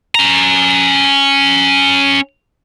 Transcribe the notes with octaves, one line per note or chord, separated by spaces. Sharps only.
C#4 A#5